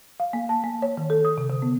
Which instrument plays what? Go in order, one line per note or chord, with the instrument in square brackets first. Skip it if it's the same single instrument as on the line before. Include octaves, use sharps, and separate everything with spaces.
[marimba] F5
A#3
A5
A#3
C#5
D#3
A4
D#6
C3
D3
B3